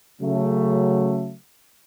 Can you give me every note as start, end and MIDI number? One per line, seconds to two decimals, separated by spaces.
0.21 1.34 49
0.21 1.34 54
0.21 1.34 57